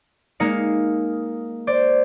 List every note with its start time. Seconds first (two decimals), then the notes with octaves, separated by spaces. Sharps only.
0.40 G#3 A#3 D#4 F5 C#7
1.67 C5 D5